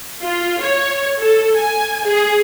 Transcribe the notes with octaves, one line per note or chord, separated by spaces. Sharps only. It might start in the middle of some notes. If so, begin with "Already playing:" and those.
F4
C#5
A4
G#5
G#4